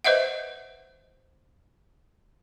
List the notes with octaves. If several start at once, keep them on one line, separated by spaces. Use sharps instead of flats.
B4 C5 D#5 E5 F#5